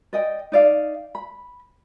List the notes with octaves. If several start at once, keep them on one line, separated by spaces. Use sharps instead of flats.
D5 D#5 G5
D#4 D5 F5
B5